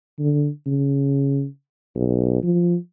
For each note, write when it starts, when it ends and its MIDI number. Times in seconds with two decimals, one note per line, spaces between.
0.19 0.48 50
0.66 1.46 49
1.95 2.43 35
2.43 2.76 53